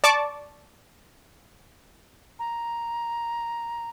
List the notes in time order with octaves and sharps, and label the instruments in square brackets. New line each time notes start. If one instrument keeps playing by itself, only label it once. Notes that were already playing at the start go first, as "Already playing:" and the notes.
[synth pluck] D5 A5 C#6 D6
[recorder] A#5